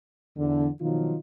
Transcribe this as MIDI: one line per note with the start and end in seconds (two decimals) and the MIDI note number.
0.38 0.68 40
0.38 0.68 50
0.81 1.16 47
0.81 1.16 51
0.81 1.16 53
0.81 1.16 54
0.81 1.16 63
0.81 1.16 65